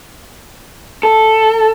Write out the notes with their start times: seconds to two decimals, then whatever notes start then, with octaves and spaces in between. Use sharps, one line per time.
1.03 A4